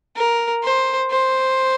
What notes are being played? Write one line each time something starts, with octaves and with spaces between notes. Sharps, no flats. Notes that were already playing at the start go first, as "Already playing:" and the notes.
A#4
C5
C5